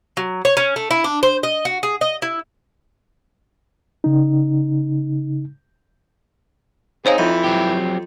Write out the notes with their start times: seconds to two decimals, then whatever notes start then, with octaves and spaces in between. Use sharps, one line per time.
0.17 F#3
0.45 C#5
0.57 C#4
0.76 A3
0.91 E4
1.04 D4
1.23 C5
1.43 D#5
1.65 F#4
1.83 G#4
2.01 D#5
2.22 E4
4.04 C#3 D#4
7.06 C4 D#4 G#4 C5 C#5 F5
7.18 F2 E3 E4
7.44 F#3 C4 G4